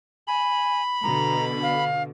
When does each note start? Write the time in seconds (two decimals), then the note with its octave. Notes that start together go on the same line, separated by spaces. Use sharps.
0.27 G#5 B5
1.03 B2 D3 A#5
1.63 F5